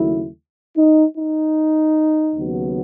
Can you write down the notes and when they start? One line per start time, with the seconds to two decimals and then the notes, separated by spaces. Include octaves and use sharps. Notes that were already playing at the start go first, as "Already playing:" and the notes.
Already playing: D#2 C#3 F#3 A3 E4
0.77 D#4
1.16 D#4
2.35 D#2 C#3 F#3 B3